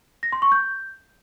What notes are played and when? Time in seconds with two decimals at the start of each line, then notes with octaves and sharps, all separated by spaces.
0.23 A#6
0.32 C6
0.42 C#6
0.52 G6